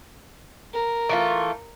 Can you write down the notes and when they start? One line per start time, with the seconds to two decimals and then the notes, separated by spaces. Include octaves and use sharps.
0.73 A#4
1.09 E3 A3 F4